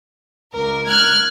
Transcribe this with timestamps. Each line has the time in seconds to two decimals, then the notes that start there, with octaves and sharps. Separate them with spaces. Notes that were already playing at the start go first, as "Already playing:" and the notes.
0.54 C#2 A#4
0.87 F6 F#6 G#6